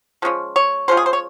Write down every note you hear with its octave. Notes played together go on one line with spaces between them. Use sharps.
F3 G#3 C#4 F4
C#5
F3 G#3 C#4 F4 C5
G#4
C5
C#5